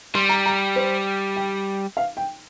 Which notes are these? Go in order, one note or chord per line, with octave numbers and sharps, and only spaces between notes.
G3 C6
A#5
A#5
C5
G5
F5
G5